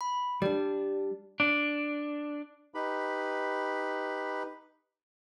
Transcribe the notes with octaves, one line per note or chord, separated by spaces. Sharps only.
B5
G3 D4 D5
D4
D#4 G4 B4 B5